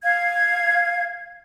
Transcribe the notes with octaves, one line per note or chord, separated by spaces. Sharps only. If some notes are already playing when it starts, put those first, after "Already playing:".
F5 G#6